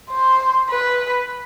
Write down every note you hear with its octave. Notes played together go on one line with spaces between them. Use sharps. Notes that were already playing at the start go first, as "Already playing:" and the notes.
C5
B4